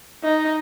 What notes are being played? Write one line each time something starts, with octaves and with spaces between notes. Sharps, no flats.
D#4